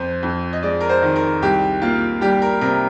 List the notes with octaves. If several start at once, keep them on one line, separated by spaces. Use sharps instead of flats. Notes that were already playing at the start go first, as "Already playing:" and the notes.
Already playing: F2 C5
F2
D#5
G#3 D5
A#4
C5
D#3
A#4
C2 G4
A#3 F4
G3 G4
A#4
C3 A#4